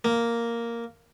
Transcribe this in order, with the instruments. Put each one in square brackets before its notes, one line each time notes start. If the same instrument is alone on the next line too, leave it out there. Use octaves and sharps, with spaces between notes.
[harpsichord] A#3